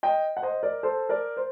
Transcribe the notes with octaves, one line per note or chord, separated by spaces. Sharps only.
D#5 G5
F#5
C5 D#5
A#4 D5
A4 C5
A#4 D5
C5